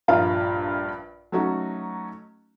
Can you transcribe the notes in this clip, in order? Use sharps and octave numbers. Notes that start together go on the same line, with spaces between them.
A#1 G2 F4 D#5 F5 A#5
F#3 A3 C#4 D#4 F#4